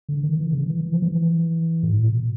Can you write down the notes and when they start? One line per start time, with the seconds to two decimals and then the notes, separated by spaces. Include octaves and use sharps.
0.09 D3
0.23 D#3
0.37 E3
0.46 D3
0.53 C#3
0.66 E3
0.81 E3
0.92 F3
1.02 E3
1.20 F3
1.25 E3
1.83 G#2
1.92 A2
2.02 A#2
2.11 B2